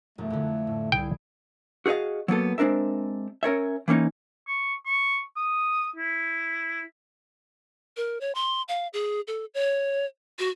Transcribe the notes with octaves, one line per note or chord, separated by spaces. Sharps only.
E1 F#2 A3
F2 D3
A2
C2 E4 G#4 G5
F#4 G#4 C5 D#5 F5
F#3 A#3 B3 A4
G#3 C4 D4 A#4 E5
C#4 A#4 C#5 E5
E3 A#3 C#4 D#4
C#6
C#6
D#6
E4
A#4
C#5
C6
F5
G#4
A4
C#5
F#4